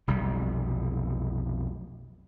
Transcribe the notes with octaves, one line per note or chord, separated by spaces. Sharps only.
F1 B1 C3 G3